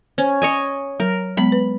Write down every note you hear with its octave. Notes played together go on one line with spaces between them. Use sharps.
C#4 C5
C#5 D#5 G#5
F#3 A#4
F#3 G#3 B3 B5
B4